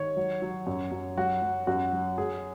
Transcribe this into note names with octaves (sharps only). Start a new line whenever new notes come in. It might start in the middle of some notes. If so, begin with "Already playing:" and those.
Already playing: D#3 C#5
F#3
F#3
F#2
F#2
F#3 F#4
F#3
F#2 F#4
F#3
F#3 G#4